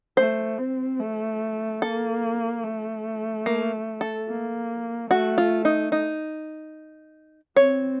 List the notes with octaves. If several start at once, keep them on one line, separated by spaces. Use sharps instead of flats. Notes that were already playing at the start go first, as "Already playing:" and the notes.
A3 C5
C4
A3
A#3 A4
A3
A#3
A4
A#3
A3 F#4
F4
D#4
D#4
C4 C#5